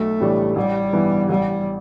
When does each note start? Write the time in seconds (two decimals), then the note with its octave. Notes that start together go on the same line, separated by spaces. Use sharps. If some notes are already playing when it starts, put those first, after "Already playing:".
Already playing: B1 A3
0.20 A2 E3 G3 D4
0.56 A1 G3
0.93 G2 E3 B3 E4
1.29 A1 G3